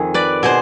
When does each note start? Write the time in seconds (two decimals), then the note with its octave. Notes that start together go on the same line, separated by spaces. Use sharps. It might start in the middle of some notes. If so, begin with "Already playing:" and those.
Already playing: F2 D#3 G#4
0.14 B4 D5
0.43 B2 G#4 C5